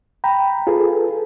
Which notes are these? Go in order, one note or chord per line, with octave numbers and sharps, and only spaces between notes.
G5 A#5 B5
F4 G#4 A4 B4